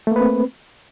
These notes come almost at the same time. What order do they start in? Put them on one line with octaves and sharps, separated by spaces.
A3 A#3 B4 C4